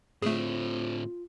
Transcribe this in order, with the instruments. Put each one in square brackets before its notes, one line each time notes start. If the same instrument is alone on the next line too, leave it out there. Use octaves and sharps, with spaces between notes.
[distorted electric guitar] A2 D3 [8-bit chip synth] A3 G#4 [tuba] C4 [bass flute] F4